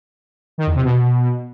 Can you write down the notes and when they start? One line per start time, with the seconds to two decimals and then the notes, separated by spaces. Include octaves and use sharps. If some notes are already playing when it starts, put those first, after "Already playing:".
0.58 D#3
0.66 E2
0.75 C3
0.84 B2